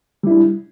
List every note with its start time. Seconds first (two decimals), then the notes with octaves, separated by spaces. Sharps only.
0.23 G3
0.27 E4
0.30 D4